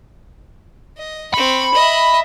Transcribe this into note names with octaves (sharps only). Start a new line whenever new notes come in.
D#5
C4 B5 C#6
D#5 E5